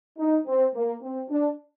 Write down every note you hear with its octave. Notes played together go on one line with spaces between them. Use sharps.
D#4
C4
A#3
C4
D4